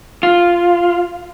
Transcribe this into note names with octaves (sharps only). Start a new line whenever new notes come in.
F4